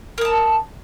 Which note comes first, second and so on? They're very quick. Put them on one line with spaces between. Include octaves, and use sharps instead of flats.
A#4 D#6 A5